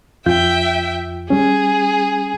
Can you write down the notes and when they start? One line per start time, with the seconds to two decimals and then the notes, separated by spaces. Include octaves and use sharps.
0.26 F2 F4 E5 G5 G6
1.30 G3 C#4 G#4